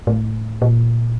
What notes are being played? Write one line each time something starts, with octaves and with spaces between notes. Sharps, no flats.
A2
A#2